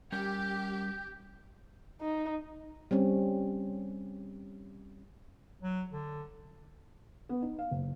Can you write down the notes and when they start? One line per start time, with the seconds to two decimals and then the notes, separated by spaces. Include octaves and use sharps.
0.12 G3 C#4 G4 A#4 G6
2.01 D#4
2.91 G3 C4 C#4
5.62 F#3
5.91 D3
7.29 B3
7.42 D#4
7.59 F5
7.71 F#1